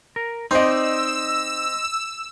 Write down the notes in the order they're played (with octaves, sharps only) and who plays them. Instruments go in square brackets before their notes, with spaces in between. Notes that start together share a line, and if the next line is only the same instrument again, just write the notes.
[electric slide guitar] A#4
[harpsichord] C4 [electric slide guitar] D#4 D5 [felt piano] D#5 C6 [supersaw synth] E6